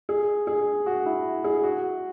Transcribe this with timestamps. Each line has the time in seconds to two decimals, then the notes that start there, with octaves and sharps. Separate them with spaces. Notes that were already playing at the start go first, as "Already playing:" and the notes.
0.09 G#4
0.47 G#4
0.86 F#4
1.06 E4
1.44 G#4
1.63 F#4